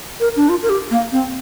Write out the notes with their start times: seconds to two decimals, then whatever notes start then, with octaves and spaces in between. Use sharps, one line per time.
0.20 A#4
0.36 D4
0.49 F4
0.63 A#4
0.70 G4
0.90 A#3
1.12 C4